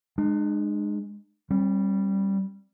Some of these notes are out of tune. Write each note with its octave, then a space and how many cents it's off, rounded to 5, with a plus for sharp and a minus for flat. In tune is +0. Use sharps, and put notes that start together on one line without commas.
G#3 +0 D4 +45
G3 +0 C4 +45